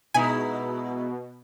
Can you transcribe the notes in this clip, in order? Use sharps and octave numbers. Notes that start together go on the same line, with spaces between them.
B2 G#3 D#4 E4 G#5